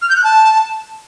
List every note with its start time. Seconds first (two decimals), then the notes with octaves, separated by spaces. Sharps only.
0.02 F6
0.09 G6
0.17 F#6
0.24 A5